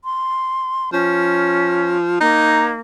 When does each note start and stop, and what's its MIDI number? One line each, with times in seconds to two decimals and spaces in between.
0.04 0.90 84
0.93 2.17 53
0.93 1.97 61
2.20 2.80 58
2.20 2.73 63